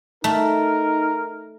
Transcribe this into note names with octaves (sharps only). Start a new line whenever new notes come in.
A3 D#4 A#4